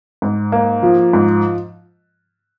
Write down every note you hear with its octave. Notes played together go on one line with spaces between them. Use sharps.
G#2
A#3
F3
G#2